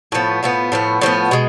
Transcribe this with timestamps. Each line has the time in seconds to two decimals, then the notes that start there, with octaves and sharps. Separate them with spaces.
0.12 A2 F3 B3
0.43 A2 F3 B3
0.72 A2 F3 B3
1.01 A2 F3 B3
1.31 B2 G#3